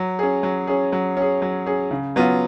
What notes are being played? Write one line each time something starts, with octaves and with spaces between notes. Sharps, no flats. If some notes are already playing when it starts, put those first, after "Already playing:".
Already playing: F#3
C#4 G#4
F#3
C#4 G#4
F#3
C#4 G#4
F#3
C#4 G#4
C#3
F#3 B3 F4